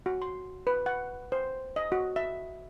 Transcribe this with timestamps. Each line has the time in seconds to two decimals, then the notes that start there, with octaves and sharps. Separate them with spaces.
0.06 F#4
0.22 C6
0.67 B4
0.86 F#5
1.32 C5
1.76 D#5
1.92 F#4
2.16 E5